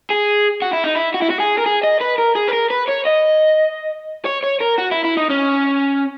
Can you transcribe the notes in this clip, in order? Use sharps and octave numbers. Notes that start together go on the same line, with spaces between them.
G#4
F#4
E4
D#4
E4
F#4
E4
F#4
G#4
A#4
G#4
D#5
B4
A#4
G#4
B4
A#4
B4
C#5
D#5
C#5
C#5
A#4
F#4
E4
E4
D#4
C#4